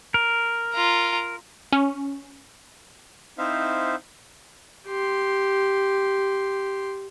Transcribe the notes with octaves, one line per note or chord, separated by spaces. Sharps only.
A#4
F4 A#5
C#4
C4 D#4 E4 C5 E5 F5
G4 C6